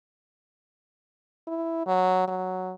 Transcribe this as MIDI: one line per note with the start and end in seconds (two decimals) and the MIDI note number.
1.47 1.85 64
1.86 2.28 54
2.28 2.73 54